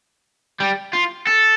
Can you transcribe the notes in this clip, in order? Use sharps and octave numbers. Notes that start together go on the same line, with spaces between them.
G3
F4
A4